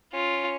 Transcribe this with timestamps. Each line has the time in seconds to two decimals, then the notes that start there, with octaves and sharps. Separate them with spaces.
0.13 C#4 F4